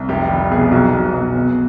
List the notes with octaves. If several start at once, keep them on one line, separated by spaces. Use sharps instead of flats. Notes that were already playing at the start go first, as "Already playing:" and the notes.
Already playing: C2
F1 G4
G3
B2 G#4
G4
B1 F#4
B1
B1
B2